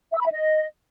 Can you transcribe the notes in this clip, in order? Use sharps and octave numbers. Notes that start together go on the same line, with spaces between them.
E5
E6
B5
E5
D#5